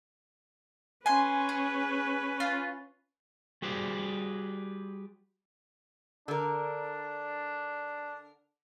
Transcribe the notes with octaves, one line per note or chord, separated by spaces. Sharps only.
C#4 B4 G#5 C6
G#4
F4
G3 F#4 G#4 B4 C5 D5
D3 D4 A#4